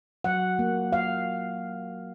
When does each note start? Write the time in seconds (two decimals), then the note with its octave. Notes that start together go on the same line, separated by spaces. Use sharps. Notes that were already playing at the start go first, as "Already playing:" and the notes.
0.24 F#3 F#5
0.59 A#3
0.93 F5